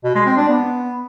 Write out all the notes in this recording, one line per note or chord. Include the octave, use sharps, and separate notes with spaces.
B2
G#3
C4
D4
B3